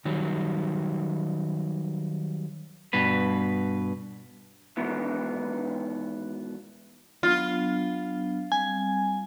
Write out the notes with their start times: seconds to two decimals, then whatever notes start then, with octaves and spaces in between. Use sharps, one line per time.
0.05 D#3 F#3 G3
2.93 G2 B2 B4
4.77 G#2 B2 D#3 E3 B3
7.23 F#3 B3 D4 F4
8.52 G3 C4 G#5